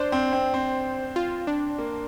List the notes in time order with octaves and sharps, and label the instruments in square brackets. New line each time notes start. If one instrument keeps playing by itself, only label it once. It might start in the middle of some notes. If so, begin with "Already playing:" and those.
Already playing: [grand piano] D4 [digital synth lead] C5
[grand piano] C4
C4
C4
[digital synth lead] F4
D4
[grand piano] A#3